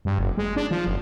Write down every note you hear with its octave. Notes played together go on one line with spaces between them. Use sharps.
G2
F#1
G#3
D4
F3
F#1